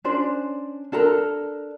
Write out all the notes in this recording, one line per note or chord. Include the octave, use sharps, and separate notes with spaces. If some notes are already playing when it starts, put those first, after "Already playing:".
C#4 D4 C5 D5
D4 A4 A#4 A#5